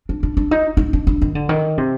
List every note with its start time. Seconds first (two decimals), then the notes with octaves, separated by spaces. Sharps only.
0.09 D4
0.23 D4
0.37 D4
0.51 D#4
0.77 D#4
0.93 D4
1.07 D4
1.22 D#3
1.35 D3
1.49 D#3
1.78 C3